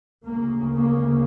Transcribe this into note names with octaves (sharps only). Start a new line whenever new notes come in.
D2 C#3 A#3
A#3